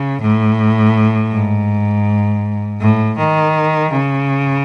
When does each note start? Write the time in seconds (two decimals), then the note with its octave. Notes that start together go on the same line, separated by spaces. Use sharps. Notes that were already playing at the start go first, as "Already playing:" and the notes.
Already playing: C#3
0.21 A2
1.32 G#2
2.81 A2
3.17 D#3
3.91 C#3